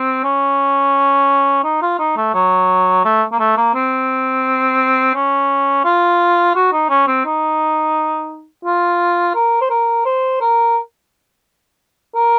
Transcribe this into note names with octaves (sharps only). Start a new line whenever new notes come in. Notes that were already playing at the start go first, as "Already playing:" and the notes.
Already playing: C4
C#4
D#4
F4
D#4
A3
F#3
A3
A#3
A3
A#3
C4
C#4
F4
F#4
D#4
C#4
C4
D#4
F4
A#4
C5
A#4
C5
A#4
A#4